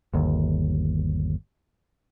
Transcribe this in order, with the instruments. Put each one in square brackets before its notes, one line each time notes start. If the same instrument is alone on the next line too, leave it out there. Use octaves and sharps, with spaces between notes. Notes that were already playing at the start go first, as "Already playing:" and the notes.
[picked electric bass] G1 D#2